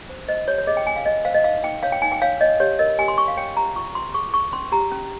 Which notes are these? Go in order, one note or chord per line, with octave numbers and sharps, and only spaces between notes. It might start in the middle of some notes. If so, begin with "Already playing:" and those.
C5
C5 D#5
G4 C#5
C#5
G#4 D#5
G5
C#4 G#5
F5
C#4 D#5
C5 F5
D#5
D#4 F5
D#4 G5
C#5 F5
G5
D#4 G#5
G5
C#5 F5
C#5 D#5
G4 C#5
A#4 D#5
G4 G#5
C6
G4 C#6
F5
C#5 G5
G4 A#5
F4 C#6
F4 C6
G#4 C#6
G#4 C#6
C#4 C6
G4 A#5
C#4